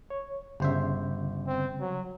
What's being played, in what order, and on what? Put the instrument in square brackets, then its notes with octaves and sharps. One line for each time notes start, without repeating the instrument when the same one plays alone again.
[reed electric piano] C#5
[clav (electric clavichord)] G1 C5 E5 [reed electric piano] C#3 G3
[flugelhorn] C4
F#3